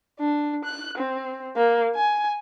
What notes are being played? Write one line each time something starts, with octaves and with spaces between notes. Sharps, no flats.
D4
F#6
C4
A#3
G#5